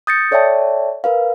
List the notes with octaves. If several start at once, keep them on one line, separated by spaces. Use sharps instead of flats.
D#6 G6 A6 A#6 C#7
A4 C#5 D5 E5 G5 A5
A#4 B4 F5